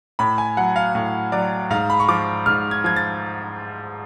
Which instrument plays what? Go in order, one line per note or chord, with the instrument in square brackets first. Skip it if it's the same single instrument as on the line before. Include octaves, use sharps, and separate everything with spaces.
[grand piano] A2 B5
G#5
F#3 F#5
F5
A2
F#3 D5
G#2 F5
B5
C#6
F3 D6
G#2 F6
G#6
F3 G#6
A6